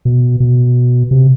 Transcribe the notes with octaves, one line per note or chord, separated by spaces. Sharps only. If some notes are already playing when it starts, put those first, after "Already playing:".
B2
B2
C3